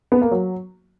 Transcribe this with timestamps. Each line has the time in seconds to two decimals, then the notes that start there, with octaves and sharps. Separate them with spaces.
0.12 B3
0.22 A#3
0.31 F#3